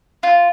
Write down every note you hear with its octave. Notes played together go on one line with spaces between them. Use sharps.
F4